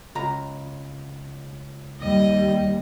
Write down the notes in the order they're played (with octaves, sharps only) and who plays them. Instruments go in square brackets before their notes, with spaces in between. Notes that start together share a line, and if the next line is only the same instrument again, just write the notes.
[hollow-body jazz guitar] C#2 A#5
[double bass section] D#2 G3 [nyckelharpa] D#5